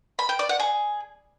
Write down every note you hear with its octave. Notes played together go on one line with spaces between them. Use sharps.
B5
G5
D5
F#5
G#4